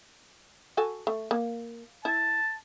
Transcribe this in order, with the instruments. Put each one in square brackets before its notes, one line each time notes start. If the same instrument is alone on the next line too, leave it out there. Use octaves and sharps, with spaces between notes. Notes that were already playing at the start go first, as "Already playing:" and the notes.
[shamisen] F#4 A4 G#5
A3
A#3
[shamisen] E4 [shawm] A5